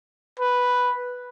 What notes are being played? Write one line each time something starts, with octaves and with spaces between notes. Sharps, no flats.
B4